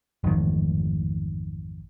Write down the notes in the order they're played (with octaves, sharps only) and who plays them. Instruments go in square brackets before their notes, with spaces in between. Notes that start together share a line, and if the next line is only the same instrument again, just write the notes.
[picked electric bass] A1 F2 G#2 D#3